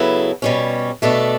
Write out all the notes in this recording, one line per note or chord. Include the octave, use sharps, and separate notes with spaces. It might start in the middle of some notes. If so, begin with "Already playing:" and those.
Already playing: C#3 F#3 B3 E4 A4
B2 G3 C#4
B2 A3 D4 A4